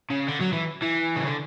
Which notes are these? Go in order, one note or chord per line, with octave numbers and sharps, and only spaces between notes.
C#3
D3
F#3
E3
E3
C#3
D3